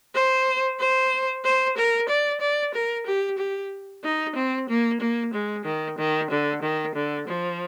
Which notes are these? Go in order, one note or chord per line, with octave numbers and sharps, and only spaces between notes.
C5
C5
C5
A#4
D5
D5
A#4
G4
G4
D#4
C4
A#3
A#3
G#3
D#3
D#3
D3
D#3
D3
F3